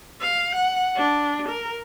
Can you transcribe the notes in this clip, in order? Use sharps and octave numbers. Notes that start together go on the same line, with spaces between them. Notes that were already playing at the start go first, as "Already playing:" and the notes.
F5
F#5
D4
A#4